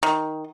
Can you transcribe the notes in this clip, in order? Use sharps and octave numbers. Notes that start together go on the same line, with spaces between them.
D#3